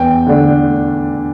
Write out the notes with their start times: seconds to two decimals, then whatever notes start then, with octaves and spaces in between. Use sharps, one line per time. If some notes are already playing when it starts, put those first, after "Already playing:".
Already playing: E2 G5
0.27 D3 A3 D4